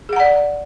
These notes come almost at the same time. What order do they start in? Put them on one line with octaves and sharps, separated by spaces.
G#4 F#5 A#5 D5